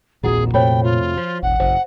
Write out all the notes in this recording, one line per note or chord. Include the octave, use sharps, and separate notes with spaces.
D#1 A#1 F2 A#2 E4 F#4 G#4 F#5
F2 C3 A3 C5 C#5 G5 B5
F4
F3
E1 A1 F#5
F#1 C5